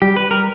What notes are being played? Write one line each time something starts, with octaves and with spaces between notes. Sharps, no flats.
G3 G4
B4
A#4